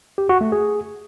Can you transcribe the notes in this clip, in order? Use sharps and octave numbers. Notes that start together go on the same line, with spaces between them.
G4
F#4
A3
G#4